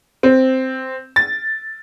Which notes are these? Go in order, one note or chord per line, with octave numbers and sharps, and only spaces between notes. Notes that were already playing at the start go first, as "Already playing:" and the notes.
C4
A6